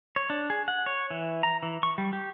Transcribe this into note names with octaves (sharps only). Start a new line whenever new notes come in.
C#5
D4
G#4
F#5
C#5
E3
A#5
E3
C#6
G3
G4